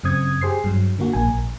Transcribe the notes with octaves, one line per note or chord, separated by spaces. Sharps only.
F#2 C#3 C4 D#6 G#6
G4 G#4 C5 C7
G2 F#3
D3 A#3 F#4
A#1 A#3 G#5
A#1